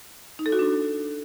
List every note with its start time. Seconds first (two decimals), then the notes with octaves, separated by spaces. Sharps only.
0.39 D#4
0.46 A4
0.52 F#4
0.59 D4